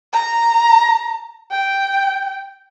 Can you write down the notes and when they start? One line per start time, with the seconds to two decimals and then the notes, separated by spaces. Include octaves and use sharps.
0.13 A#5
1.51 G5